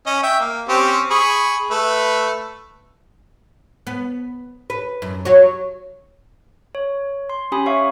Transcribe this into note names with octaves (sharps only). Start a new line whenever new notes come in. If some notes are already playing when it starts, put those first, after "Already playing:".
C#4 D#5
E5 G5
A#3
C4 C#4 G4
G#4 B5 C#6
A3 B4
B3
B4
F#2
F#3 F#4 C#5
C#5
C6
C#4 G4 G#5 B5 D#6
C#5 E5 F5 C#6